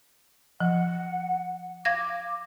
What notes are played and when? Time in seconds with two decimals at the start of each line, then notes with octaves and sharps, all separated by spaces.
0.60 F3 F#5
1.85 F5 D6 G#6 A#6